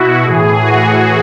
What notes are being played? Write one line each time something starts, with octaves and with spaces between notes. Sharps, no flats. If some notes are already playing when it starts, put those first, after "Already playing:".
Already playing: B2 E4 F#4
A2 E3 G#4
F#4